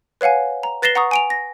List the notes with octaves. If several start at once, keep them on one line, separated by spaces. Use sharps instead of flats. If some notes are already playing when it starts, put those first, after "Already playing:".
B4 C#5 F5 F#5 G#5
A#5
B4 A6 A#6 C7 E7 G7
F#5 A#5 C#6 D#6
G#5 D7 F7
A#6